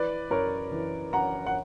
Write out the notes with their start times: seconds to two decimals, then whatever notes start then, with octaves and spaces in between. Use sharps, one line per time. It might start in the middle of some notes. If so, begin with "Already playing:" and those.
Already playing: E3 B4 D5
0.30 F#2 A#4 C#5
0.72 E3
1.13 F#2 F#5 A#5
1.46 F#5